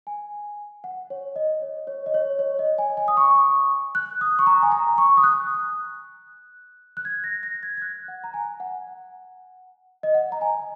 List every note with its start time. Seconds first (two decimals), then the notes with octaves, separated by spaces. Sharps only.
0.07 G#5
0.84 F#5
1.10 C#5
1.36 D#5
1.62 C#5
1.87 C#5
2.06 D#5
2.14 C#5
2.39 C#5
2.59 D#5
2.78 G#5
2.97 G#5
3.08 D#6
3.17 C#6
3.95 F#6
4.21 D#6
4.39 C#6
4.47 A#5
4.63 G#5
4.72 A#5
4.98 C#6
5.17 D#6
5.23 F#6
6.97 F#6
7.05 G#6
7.24 A#6
7.43 A#6
7.63 G#6
7.77 G#6
7.82 F#6
8.08 F#5
8.24 A#5
8.34 G#5
8.60 F#5
10.03 D#5
10.15 F#5
10.32 A#5
10.41 G#5